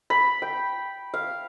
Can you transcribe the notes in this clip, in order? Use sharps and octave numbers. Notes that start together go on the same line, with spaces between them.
B5
G5
F5